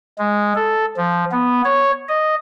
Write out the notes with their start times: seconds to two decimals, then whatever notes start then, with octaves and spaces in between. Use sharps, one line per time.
0.18 G#3
0.55 A4
0.97 F3
1.31 B3
1.65 C#5
2.09 D#5